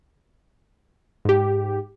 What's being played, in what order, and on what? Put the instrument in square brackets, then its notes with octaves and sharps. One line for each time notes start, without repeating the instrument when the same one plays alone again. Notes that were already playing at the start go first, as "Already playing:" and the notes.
[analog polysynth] G#2 G4